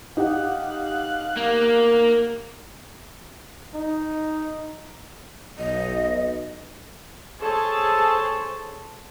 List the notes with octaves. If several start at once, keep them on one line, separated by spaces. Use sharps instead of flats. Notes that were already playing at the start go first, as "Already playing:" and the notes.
D#4 G4 F5 F#5 F#6
A#3
D#4
B1 D#5
G#4 A4 C5 C#5 A5